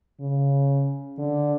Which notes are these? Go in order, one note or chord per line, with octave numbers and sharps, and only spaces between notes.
C#3
D3